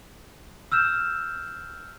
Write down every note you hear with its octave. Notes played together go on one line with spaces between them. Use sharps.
E6 F6 G6 E7